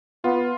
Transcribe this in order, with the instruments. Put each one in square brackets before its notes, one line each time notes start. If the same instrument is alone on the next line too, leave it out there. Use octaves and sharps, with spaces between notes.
[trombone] B3 [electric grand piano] F4